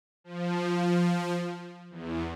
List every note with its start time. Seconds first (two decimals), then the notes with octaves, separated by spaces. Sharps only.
0.24 F3
1.90 E2